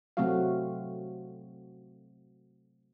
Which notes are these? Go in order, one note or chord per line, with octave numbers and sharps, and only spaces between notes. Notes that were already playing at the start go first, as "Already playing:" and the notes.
C3 F#3 A3 C4 F#4 F5